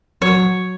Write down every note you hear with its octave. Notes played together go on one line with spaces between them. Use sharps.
F#3 C#5